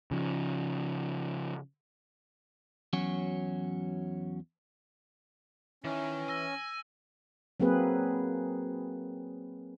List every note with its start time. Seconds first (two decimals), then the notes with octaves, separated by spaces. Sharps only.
0.11 C#3 F3
2.93 E2 F#3 C#4 F#4
5.84 D#3 E3 C#4
6.29 G#5 E6 A#6 G7
7.60 F#3 A#3 C4 G#4 B4